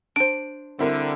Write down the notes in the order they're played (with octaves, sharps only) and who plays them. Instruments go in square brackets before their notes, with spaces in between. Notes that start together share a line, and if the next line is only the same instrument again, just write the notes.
[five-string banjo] D4 C5 [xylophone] D7
[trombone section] D3 G3 [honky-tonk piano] C4 E4 A#4